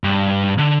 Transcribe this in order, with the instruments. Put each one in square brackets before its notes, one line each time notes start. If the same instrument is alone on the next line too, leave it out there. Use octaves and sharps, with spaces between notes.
[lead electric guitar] G2
D3